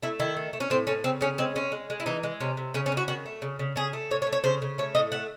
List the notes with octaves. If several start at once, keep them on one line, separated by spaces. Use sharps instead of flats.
A3 E4
D#3 E4
A3
A3
C#4
A2 C4
A2 C#4
C#3 C4
C#3 C#4
G#3 C4
G#3 C#4
G#3
G#3
E4
E3 D#4
G#3
C3 C#4
C3
C#3 C#4
C#4
C#3
F#4
D#3 F#4
A3
C#3
C#3
C#3 G#4
A3
A2 C#5
C#5
A3
C#5
C#3 C5
C#3
A3 C#5
A2 D#5
A3 F#5